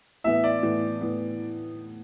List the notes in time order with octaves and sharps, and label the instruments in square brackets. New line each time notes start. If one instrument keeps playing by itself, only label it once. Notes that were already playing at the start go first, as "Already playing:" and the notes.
[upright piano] A2 E3 B3 [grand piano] E5
[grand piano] D5
[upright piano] A2 E3 B3
A2 E3 B3